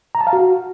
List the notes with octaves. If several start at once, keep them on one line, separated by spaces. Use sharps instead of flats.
A#5
A5
F5
F#4